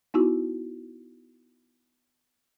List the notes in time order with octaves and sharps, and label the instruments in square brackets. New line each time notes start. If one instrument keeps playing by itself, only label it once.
[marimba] B3 D#4 E4 F#4